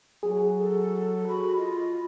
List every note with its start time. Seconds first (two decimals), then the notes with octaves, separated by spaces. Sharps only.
0.23 F#3 G#4
0.57 A4
1.28 F#4 B5
1.57 F4 D#5